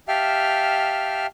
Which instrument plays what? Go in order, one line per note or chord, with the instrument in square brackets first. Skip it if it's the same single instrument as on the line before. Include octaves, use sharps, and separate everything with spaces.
[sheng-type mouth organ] G4 E5 F5 G5 A5 F6